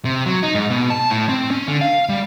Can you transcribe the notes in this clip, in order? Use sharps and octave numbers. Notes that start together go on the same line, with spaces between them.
C3
F#3
D#4
G#2
B2
A5
A2
C4
C#4
D3
F5
G3